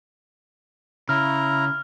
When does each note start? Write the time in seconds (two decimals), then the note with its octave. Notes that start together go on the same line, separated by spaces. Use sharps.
1.09 C#3 E4 A#5 F6